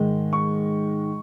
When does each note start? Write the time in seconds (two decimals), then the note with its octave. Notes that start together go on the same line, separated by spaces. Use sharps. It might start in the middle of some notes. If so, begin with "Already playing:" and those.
Already playing: G#2 D#3 G#3
0.33 C#6